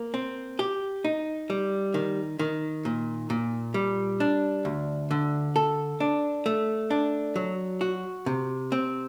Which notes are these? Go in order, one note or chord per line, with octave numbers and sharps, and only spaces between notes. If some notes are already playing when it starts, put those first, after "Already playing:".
Already playing: A#3
C4
G4
D#4
G3
D#3
D#3
A#2
A#2
G3
D4
D2
D3
A4
D4
A3
D4
F#3
F#4
C3
C4